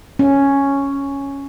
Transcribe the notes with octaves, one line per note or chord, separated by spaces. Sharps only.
C#4